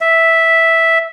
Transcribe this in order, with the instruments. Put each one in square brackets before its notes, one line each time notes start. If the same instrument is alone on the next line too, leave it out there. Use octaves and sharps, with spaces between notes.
[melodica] E5